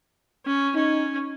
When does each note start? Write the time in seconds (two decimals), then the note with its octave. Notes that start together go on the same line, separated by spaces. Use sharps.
0.46 C#4
0.75 C#4 D#4